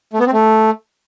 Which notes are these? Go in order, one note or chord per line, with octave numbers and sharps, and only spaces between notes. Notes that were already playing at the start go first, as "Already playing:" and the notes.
A3
B3
C4
A3